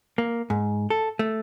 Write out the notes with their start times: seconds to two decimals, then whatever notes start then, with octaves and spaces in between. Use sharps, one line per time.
0.18 A#3
0.50 G#2
0.90 A4
1.19 A3